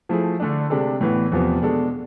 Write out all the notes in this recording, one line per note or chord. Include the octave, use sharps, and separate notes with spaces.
F3 A3 E4 G#4
D3 A3 D4
C3 G#3 D4 A4
A2 E3 B3
E2 C3 F3 B3
B2 G#3 D4 A4